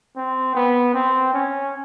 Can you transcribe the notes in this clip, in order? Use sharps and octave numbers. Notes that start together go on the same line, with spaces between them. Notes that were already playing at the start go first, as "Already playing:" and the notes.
C4
B3
C4
C#4